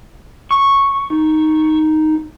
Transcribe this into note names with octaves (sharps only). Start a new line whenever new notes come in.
C#6
D#4